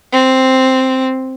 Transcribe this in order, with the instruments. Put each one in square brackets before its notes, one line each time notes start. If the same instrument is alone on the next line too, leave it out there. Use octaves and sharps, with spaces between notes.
[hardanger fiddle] C4